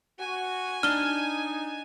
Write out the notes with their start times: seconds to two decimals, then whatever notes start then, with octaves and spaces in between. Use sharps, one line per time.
0.19 F#4 G#5
0.83 D4 D#4 F6 G7